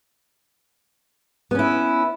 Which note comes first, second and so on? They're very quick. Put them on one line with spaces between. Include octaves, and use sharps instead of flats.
B3 C#4 E4